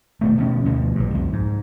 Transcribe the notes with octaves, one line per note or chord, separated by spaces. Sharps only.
D#1 B2 A3
B2 F3 C#4
D2 G2 B2 F3
A#1 G2
C2 F2
G#2